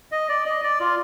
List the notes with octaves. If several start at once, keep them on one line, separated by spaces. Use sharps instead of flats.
D#5
D5
D#5
D5
F4